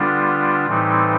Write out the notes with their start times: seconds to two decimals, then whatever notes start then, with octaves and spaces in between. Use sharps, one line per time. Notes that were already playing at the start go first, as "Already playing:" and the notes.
Already playing: D3 G3 B3 D4 F4
0.66 A2 E3 G3 C4 D#4